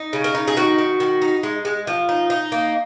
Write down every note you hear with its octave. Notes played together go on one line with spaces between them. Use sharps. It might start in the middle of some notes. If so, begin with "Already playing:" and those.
Already playing: D#4
C#3
A#4
D#4
G#4
D#3 F#4
D#3
D#3
D#4
G#3
G#3
F3
D#4
D#4
A#3